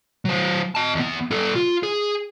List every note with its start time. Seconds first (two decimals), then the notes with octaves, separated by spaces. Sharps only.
0.25 F#3 C5
0.75 D#5 A5
0.95 E2 B3
1.31 G3 A4
1.55 F4
1.83 G#4